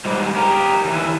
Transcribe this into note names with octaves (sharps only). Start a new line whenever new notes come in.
G#2 G3
G4 A#4
D#2 E3